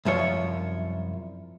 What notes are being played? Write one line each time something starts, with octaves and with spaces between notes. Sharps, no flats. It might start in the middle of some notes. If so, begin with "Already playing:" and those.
C2 F#2 F3 C#5